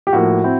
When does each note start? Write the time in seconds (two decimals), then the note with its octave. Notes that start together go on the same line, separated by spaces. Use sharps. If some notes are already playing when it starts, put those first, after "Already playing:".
0.07 G4
0.13 A2 F3 A#3 F#4
0.44 C4 E4